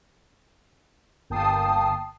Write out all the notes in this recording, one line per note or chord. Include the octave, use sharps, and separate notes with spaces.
G1 A#3 G5 A5 D#6 C7